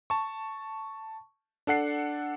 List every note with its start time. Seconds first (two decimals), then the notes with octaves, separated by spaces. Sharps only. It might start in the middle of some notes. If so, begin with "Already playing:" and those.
0.10 A5 C#6
1.67 D4 A4 F#5 C7